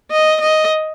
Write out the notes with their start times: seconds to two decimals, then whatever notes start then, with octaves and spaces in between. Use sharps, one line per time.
0.12 D#5
0.41 D#5